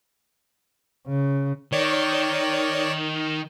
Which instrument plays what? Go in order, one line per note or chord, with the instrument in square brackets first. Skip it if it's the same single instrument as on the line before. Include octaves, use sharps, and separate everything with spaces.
[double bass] C#3
[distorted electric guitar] D#3 [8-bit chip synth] C#5 D5